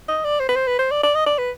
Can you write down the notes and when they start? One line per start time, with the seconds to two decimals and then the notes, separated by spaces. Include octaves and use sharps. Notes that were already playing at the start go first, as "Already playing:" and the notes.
0.08 D#5
0.24 D5
0.40 C5
0.49 B4
0.56 C5
0.67 B4
0.79 C5
0.91 D5
1.03 D5
1.15 D#5
1.26 D5
1.38 B4